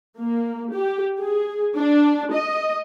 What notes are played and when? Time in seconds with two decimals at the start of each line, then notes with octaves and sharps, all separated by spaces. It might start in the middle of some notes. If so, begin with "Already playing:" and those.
0.18 A#3
0.74 G4
1.20 G#4
1.76 D4
2.33 D#5